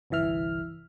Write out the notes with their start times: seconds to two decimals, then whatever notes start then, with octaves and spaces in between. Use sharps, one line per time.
0.10 G1 C2 E3 E5 F6